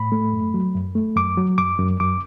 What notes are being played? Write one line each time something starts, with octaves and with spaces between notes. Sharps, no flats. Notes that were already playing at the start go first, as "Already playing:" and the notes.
Already playing: A2 B5
A3
F#2
F#3
F#2
A3
F#2 D6
F#3
F#2 D6
F#2
F#2 D6